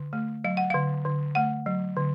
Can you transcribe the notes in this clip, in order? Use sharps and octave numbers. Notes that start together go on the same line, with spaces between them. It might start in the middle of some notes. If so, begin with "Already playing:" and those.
Already playing: D3
A3
F#3 F5
F#5
D3 F5
D3
A3 F#5
F#3
D3